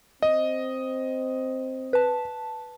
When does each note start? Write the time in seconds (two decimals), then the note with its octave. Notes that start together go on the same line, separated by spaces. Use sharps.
0.22 C4 D#5
1.93 B4 A5